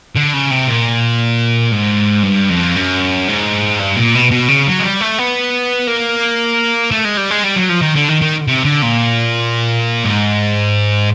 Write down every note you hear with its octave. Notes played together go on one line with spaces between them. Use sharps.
D3
C#3
C3
A#2
G#2
G2
F2
F#2
G#2
G2
A#2
B2
B2
C#3
F#3
G#3
G3
A3
B3
A#3
A3
G#3
G3
G#3
G3
F#3
F3
D#3
D3
D#3
D#3
C3
D3
A#2
G#2